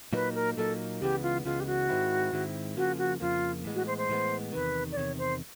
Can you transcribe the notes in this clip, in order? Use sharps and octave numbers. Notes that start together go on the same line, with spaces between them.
A#2 F#3 A#3 D#4 B4
A#4
A#2 F#3 A#3 D#4 A4
C#2 C#3 E3 G#3 B3 G4
F4
C#2 C#3 E3 G#3 B3 F4
G4
F#4
G#2 D#3 G#3 C4 E4
G#2 D#3 G#3 C4 E4
F2 C#3 F3 A#3 F#4
F#4
F2 C#3 F3 A#3 F4
A2 E3 G#3 B3
F#4
C5
C5
A2 E3 G#3 B3
E2 C3 D#3 B4
D5
E2 C3 D#3 C#5
C5